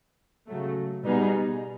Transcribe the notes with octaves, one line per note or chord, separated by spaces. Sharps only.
C#3 F#3 A3
B2 G3 B3 D#4 G#4